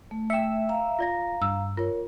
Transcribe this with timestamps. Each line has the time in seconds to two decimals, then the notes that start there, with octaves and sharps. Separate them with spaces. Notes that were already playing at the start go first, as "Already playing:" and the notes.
0.11 A3
0.30 E5 G5 E6 C#7
0.69 F5 A#5
0.99 F4 D5 A#6
1.42 G2 E6
1.77 F4 A#4 C#5